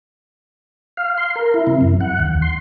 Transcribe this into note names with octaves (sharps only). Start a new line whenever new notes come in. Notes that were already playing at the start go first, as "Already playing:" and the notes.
F5
C6
A#4
E4
C3
F#2
F#5
D#2
C6